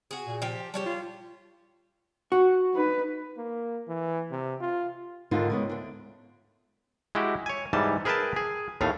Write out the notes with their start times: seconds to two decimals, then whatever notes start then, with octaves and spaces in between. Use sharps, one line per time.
0.11 F#4 G#4
0.26 A#2
0.42 F3 G4
0.74 G3 G4 C#5 A5
0.86 F4
2.32 F#4
2.73 D#4 B4
3.38 A#3
3.88 E3
4.31 C3
4.61 F4
5.31 D#2 G#2 D3 D4 D#4 F4
5.50 C#3 G#3 B3
5.69 D2 D4
7.15 G#3 E4 F#4 G4
7.46 C#5 G#5
7.73 G#2 E3 G3 A5
8.05 G#4 A#4 B4 E5 G5 A5
8.36 G#4
8.81 D#2 A2 A3 F5